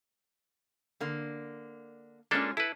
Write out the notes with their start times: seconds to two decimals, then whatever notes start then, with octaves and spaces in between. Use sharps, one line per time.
1.00 D3 A#3
2.31 G#3 A#3 C#4 D4 F4 A4
2.57 E4 A4 B4